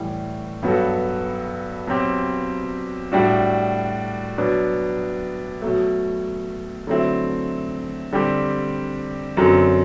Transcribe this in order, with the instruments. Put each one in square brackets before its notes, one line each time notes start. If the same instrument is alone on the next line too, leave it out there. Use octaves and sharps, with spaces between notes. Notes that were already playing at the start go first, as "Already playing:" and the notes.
Already playing: [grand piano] A2 E3 G3
G2 F#3 B3 F#4 A4
B2 F#3 C4 G4
A2 G3 D4 F#4
B2 F#3 B3 D4
B2 F#3 A3
D3 F#3 A3 C4 E4
D3 G3 C4 G4
F#2 D3 F#3 C4